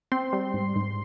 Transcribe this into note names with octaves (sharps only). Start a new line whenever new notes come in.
C4 C6
G3
G#2
G#2